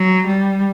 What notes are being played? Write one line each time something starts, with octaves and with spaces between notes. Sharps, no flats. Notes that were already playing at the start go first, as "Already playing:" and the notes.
Already playing: F#3
G3